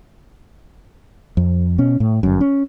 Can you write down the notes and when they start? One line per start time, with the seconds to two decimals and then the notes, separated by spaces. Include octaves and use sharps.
1.37 F2
1.78 B2 C#4
2.00 A2
2.23 G1 F#2
2.41 C#4